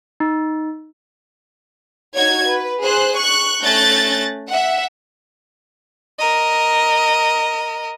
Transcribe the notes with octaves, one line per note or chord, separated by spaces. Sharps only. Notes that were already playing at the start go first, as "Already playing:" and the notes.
D#4
D#4 F#4 C#5 G#6
B4
G#4 C5 F#6
C#6 F#6
A3 C#4 F#6 G6 A6 A#6
E5 F#5
A#4 D#5